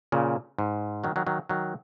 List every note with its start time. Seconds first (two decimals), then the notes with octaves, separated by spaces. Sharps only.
0.12 A#2 C#3
0.59 G#2
1.04 D#3 F#3
1.16 D#3 F#3
1.27 D#3 F#3
1.49 D#3 F#3